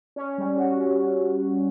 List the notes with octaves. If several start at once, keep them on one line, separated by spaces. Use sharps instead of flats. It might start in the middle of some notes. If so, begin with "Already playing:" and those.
C#4
G3
F#4
C#4